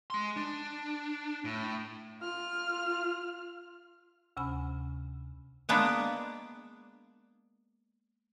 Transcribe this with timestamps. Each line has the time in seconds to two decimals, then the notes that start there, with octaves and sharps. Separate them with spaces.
0.10 G#3 C6
0.36 D4
1.45 A2
2.21 F4 F6
4.37 D2 C3 C#4 G#5 B5
5.69 G#3 A#3 B3 D4